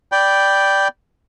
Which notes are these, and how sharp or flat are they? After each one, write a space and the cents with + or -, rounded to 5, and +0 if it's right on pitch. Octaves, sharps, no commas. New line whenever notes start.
D5 +0 G5 +0 B5 +0